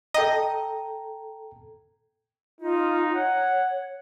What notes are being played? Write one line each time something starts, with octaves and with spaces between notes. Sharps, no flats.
A4 D#5 G5 A#5
D#4 F4
C#5 F#5